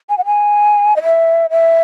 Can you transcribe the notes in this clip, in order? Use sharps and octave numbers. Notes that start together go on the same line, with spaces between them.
G#5
F#5
G#5
D#5
E5
E5